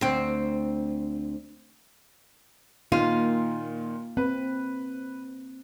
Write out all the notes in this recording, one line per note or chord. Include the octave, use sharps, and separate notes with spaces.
D2 C4
A#2 D#3 A#3 F4 D#7
C4 B4